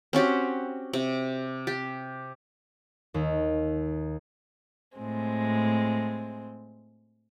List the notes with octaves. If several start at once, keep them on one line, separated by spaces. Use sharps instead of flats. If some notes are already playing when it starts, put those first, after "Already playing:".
C4 C#4 F#4 G4
C3
G4
D#2
A2 G#3 C4